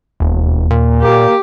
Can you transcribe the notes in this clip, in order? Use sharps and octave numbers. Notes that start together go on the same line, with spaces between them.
E1 D#2
A#2
A#3 G4